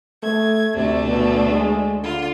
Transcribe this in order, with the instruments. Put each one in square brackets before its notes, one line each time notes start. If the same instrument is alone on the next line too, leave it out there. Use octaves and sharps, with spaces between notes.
[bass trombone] A3 [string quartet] G#6
[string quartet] D2 A3 D4 [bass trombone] C3
[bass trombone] B2
G#3
[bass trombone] D3 [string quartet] F4